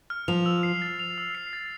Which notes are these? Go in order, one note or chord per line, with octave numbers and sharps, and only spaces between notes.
F6
F3 F7
E6
C7
A6
F7
E6
C7
A6